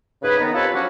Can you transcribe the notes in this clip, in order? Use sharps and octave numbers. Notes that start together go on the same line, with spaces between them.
G#2 C#3 G#4 B4
D#3 B3 A#5
C4 F4 G4 A4 B4 C#5
F3 F#3 C#4 D4 F#4